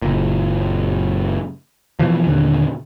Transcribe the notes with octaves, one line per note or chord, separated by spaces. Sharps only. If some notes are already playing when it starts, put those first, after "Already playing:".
F#1 A#2
B2 E3 F3
D#2 A#2 D3